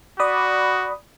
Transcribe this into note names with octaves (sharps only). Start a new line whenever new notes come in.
F#4 D5 B5 D#6